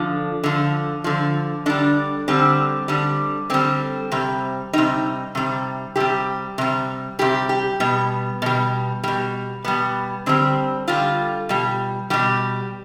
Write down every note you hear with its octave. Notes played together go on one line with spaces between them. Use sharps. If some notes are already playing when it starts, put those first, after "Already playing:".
Already playing: D3 F3 D4
D3 F3
D3 F3
D3 G3 D4
D3 G3 C4
D3 G3
D3 G3 C4
C3 G3
C3 G3 D#4
C3 G3
C3 G3 G4
C3 G3
C3 G3 G4
G4
B2 G3 B3
B2 G3
B2 G3
B2 G3 B3
D3 G3 C4
D3 G3 F4
B2 G3
B2 G3 G4